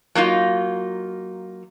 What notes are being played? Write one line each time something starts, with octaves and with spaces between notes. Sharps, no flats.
F#3 A#3 D#4 F4